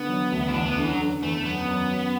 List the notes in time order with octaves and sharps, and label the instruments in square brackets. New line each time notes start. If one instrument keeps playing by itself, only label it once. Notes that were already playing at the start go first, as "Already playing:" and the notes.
Already playing: [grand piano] D3 [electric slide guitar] B3
[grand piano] F#3
D2
[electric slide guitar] E4
[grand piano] E2 [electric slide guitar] D4
[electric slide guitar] B3
[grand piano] D3 [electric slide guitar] E3
[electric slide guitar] F#3
[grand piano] D3
[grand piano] E2 [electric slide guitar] A3
[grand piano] F#2 [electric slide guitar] B3
[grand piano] F#2
F#2